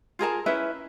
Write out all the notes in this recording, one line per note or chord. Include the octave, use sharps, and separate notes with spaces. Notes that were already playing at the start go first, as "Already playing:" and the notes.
F4 G#4 A#4 A5
C#4 E4 B4 E5